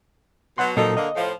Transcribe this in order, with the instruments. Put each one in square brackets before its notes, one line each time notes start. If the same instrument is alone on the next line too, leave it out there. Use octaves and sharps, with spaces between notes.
[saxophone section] B2 F#3 [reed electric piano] F#5 C6
[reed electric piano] A#2 F#3 A4 [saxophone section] F3 A#3 D#4
[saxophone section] D3 A#3 [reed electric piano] D#5
[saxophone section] A2 F3